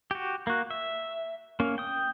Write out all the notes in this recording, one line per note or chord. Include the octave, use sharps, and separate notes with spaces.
F#4 G4
A#3 F#4
E5
A#3 C#4
G5 D#6